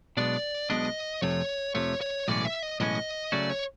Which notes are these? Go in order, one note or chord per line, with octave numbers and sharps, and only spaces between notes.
B1 B2 G#3 B3 D4 D5
B1 B2 G#3 B3 D4 D#5
F2 C3 F3 A3 C#5
F2 C3 F3 A3 C#5
C#5
B1 A2 E3 G#3 C#4 D5
E5
D#5
B1 A2 E3 G#3 C#4 D#5
C#3 F#3 A3 C#4 F#4 D5
C#5